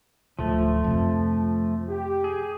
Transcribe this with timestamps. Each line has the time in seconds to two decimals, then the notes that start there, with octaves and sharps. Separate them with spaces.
0.39 D1 F3 A3
0.84 F2 C3
1.89 G4
2.24 G#4